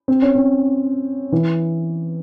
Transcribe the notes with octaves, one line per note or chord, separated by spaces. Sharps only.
C4
C#4
C4
E3